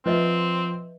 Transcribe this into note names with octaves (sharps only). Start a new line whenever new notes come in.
F3 C4 B4 D#5 E5